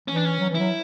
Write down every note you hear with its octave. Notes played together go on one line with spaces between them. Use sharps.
E3 C#4
D4
C#4
F#3
E3
F#3 E4